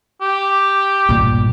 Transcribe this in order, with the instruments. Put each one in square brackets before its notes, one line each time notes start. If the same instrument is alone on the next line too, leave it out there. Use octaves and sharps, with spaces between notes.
[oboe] G4
[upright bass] G2 A#2